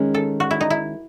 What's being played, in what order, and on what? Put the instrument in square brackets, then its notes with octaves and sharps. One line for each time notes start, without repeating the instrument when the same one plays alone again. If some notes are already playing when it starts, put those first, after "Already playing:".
Already playing: [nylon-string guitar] D#3 G#3 C#4
[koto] A4
F#4
E4
D#4
E4